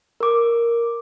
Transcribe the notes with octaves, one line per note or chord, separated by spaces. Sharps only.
A#4 D6